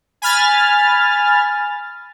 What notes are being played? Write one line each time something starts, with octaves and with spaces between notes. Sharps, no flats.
G#5 B5 F6 A6